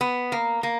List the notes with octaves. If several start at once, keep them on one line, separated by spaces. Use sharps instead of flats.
B3
A#3
A#3